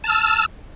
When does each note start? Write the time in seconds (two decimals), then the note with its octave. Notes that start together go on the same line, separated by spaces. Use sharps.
0.04 A5
0.07 F6
0.10 E6